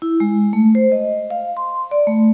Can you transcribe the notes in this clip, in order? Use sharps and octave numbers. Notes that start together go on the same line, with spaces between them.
E4
G#3
A3
C5
D#5
F5
C6
D5
A3